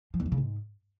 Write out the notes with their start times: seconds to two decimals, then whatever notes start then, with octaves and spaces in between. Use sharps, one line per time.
0.14 F3
0.20 E2
0.26 F3
0.32 C#3
0.38 G#2